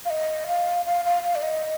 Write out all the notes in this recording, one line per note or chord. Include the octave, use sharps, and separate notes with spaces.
F5
D#5
F5
F5
F5
F5
D5
D#5